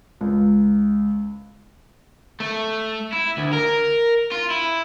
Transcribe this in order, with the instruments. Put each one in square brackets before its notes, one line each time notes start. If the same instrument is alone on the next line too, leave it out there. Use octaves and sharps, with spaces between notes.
[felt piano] C#2
[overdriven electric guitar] A3
E4
D2
A#4
F4
E4